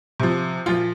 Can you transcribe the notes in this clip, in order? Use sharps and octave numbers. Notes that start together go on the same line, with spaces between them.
C3 F3
A#2 F3 F4